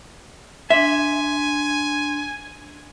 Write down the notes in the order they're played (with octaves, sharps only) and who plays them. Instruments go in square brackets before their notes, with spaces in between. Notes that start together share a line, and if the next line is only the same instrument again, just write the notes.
[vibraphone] D4 C6 [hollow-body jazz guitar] E5 [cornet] G#5